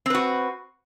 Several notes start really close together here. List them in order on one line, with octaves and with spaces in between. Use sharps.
C4 B4 F#4